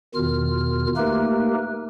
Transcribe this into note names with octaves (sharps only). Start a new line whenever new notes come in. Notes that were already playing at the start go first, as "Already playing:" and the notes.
E2 B2 D#3 F4 F6
A3 A#3 D#4 G4 A#4 B4